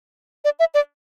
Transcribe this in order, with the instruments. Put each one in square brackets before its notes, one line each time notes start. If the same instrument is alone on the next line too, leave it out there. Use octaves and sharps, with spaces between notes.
[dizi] D5
E5
D5